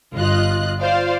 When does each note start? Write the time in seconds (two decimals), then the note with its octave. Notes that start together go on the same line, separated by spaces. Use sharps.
0.15 G1 F4 D#5 F#6
0.80 F4 C5 D5 F5